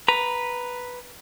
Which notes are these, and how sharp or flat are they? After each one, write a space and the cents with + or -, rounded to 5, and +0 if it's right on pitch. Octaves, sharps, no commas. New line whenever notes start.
B4 +0 A#5 +0